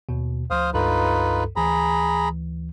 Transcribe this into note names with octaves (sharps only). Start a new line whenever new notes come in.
D#2 B2
D2 F3 C5 F5 D#6
C#2 G2 D#4 F4 A4 B4
D2 E3 G#4 A#5 B5